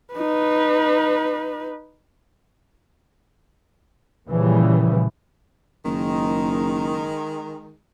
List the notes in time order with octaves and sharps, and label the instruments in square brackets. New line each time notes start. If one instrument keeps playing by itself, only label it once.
[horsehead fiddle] D#4 B4
[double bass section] A#2 C#3 E3 F3 G3
[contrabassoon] F#1 [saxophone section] D#3 G#3